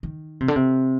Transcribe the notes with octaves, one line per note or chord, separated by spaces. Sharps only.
D#3
C3
D3
C3